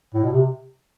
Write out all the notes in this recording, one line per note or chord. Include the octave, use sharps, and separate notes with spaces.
A2
B2
C3